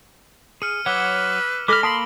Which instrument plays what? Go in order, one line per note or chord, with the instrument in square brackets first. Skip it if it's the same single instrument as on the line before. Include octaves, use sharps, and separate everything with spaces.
[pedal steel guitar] G#4 [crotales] F6 C#7 D#7
[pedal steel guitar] F#3 C#5 F#5 [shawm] B4 [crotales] D6 E6 G7
[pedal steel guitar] G#3 F6 [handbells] A4 D6 [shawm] B5 [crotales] A#6 G7
[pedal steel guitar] A#3 F5 B5 [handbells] A5 D#6 B6 [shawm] C6 [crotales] D7